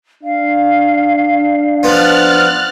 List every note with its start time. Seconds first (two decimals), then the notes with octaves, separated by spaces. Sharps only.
0.23 D4 F5
1.83 F3 B3 F6 F#6 A6